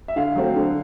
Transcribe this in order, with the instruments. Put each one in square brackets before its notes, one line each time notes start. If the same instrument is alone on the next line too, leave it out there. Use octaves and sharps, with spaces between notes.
[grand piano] E5
D3 F5
F#3 A3 C4
D3